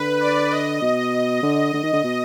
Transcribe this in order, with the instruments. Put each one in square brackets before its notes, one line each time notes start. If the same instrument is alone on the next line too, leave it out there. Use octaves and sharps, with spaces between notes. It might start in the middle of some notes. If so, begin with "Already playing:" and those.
Already playing: [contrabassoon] D3 [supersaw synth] B4
[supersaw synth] D5
D#5
[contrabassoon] B2
D3
D3
D#3
D3
B2